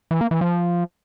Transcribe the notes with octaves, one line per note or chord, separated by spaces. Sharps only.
E3
A#3
E3
F3